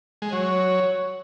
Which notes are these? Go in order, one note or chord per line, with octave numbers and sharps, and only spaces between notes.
G#3
F#3 C#5